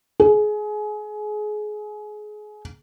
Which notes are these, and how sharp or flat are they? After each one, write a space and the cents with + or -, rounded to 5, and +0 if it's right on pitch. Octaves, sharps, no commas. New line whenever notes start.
G#4 +25